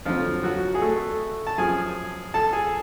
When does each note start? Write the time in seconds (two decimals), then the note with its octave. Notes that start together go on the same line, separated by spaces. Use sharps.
0.05 F2 D3 F3 F#3 F4
0.43 F#3 F#4
0.75 G#4
0.82 A3 A4
1.47 A5
1.58 F#2 F3 G#4 G#5
2.34 A4 A5
2.53 G#4 G#5